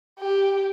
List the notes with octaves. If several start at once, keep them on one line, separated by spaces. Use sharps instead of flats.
G4